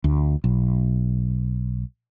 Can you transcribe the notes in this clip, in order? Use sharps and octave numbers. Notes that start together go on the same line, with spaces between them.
D2
B1